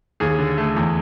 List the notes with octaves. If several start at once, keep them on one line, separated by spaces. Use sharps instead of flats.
D#2 G#4
D3
A3
E2